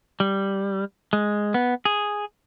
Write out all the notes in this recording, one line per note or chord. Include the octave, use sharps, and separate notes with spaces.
G3
G#3
B3
G#4